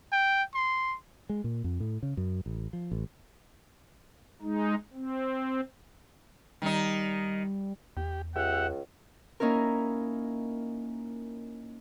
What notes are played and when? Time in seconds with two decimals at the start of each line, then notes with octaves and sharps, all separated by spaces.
0.12 G5
0.55 C6
1.29 G#3
1.44 A#2
1.64 F2
1.80 A2
2.03 C#3
2.17 F#2
2.46 A1
2.73 F3
2.92 A1
4.42 G#3 D#4
4.93 C4
6.62 D#3 G3 D#4
7.97 E2 G4
8.36 C#2 G4 E5 F#5
9.40 A#3 C#4 D#4 E4 A#4